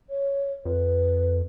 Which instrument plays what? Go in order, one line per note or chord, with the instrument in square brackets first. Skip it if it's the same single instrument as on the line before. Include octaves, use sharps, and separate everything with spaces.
[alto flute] C#5
[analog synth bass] F2 [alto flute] B4